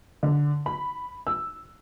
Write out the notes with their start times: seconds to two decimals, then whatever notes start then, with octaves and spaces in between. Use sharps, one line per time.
0.23 D3
0.66 B5
1.27 E6